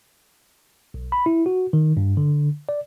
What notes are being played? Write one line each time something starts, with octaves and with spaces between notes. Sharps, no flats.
B1
B5
E4
F#4
D#3
G2
D3
D5